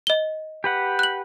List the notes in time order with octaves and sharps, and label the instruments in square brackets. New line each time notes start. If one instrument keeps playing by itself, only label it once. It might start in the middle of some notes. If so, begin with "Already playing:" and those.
[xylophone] D#5 G7
[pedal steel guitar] G4 B4 F#5
[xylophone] F#6 F#7